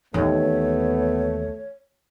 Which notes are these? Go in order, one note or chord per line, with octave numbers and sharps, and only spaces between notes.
D#2 E3 A3 B3 C#5